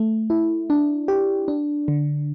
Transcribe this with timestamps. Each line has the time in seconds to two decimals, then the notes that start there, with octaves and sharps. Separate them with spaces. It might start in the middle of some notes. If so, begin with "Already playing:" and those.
Already playing: A3
0.30 E4
0.70 D4
1.08 G4
1.48 D4
1.88 D3